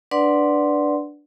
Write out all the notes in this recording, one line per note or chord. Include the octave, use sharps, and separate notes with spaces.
D4 B4 D5 F#5 C6